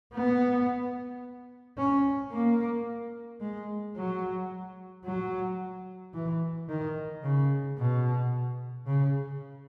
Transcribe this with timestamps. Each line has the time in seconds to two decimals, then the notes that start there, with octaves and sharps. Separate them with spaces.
0.14 B3
1.77 C#4
2.32 A#3
3.40 G#3
3.96 F#3
5.05 F#3
6.14 E3
6.69 D#3
7.24 C#3
7.78 B2
8.87 C#3